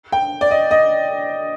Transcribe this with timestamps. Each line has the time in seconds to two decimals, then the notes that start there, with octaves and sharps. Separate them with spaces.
0.12 G5
0.41 D5
0.51 D#5
0.71 D#5